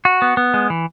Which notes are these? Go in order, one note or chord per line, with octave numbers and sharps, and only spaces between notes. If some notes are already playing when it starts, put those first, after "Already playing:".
F#4
B3
B3
G#3
E3